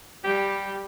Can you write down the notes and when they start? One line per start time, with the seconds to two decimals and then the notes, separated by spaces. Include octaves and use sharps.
0.24 G3 G4